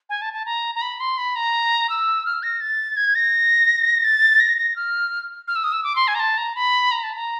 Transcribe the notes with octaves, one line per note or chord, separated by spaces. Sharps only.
G#5
A5
A5
A#5
A#5
B5
C6
B5
A#5
E6
F6
A#6
A6
G#6
A#6
A6
A#6
A#6
F6
F6
E6
D#6
E6
D6
C6
G#5
A#5
A5
A#5
B5
A#5
A5
A#5